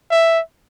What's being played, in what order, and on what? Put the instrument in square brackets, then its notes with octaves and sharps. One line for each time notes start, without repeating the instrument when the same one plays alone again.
[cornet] E5